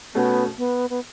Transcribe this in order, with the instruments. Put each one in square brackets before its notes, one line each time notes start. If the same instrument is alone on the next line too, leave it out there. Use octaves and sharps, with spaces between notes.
[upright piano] B2 A3 C#4 F#4 [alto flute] B3
[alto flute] B3
B3